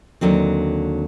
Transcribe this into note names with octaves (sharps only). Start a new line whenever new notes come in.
D#2 D3 F#3 C4